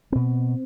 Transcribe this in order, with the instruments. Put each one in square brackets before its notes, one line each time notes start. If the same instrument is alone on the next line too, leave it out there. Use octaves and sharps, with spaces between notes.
[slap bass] B2 C4